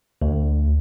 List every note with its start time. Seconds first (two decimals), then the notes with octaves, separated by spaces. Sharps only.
0.22 D2